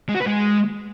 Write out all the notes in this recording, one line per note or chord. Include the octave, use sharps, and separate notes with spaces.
G#3
F#4
B4
G#3